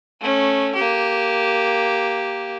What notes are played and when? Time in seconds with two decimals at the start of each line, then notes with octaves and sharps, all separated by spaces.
0.21 A3 C#4
0.75 A#3 G4